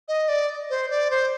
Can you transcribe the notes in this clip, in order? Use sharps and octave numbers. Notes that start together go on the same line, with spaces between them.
D#5
D5
C5
D5
C5